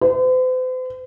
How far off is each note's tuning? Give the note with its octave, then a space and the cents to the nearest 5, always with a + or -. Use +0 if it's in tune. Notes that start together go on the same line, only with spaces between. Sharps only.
C5 -45